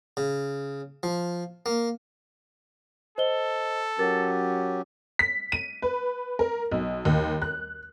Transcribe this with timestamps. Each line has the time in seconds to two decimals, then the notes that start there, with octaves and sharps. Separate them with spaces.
0.17 C#3
1.03 F3
1.66 A#3
3.18 A4 C5 D#5 G7
3.99 F#3 C#4 G4 A#4 A6
5.19 B6
5.52 D#7
5.82 B4
6.39 A#4
6.71 B1
7.05 D#2
7.42 F#6